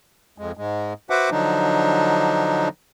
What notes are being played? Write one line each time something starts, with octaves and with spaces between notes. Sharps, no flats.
F2 G#3
G#2 G#3
F#4 B4 C5 E5 F#5 D6
D3 F3 F#3 D4 D#4